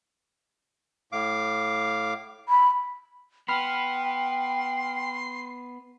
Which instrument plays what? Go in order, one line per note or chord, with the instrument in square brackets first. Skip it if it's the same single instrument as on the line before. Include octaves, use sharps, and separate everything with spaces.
[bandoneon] A2 F5 D6
[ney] B5
[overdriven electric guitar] B3 [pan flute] G5 [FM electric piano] B5 F6 [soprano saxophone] C6